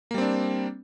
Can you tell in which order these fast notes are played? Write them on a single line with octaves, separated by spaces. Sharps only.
A#3 G3 C4 D4